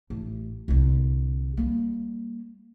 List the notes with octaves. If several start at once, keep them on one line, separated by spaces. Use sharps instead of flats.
A1
C2 D3
G3 A#3